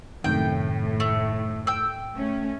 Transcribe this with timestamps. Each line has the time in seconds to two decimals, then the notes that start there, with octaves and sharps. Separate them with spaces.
0.24 F#2 A2 C3 D#3 G5
1.00 A3
1.67 G5 E6
2.16 A3 C#4